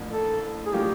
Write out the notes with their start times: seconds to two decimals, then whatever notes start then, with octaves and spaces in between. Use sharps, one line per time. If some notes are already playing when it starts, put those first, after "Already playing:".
Already playing: A1 A2 F3 A#3 D4
0.12 A4
0.66 G#4
0.73 A2 F#3 A#3 D4 F4 G4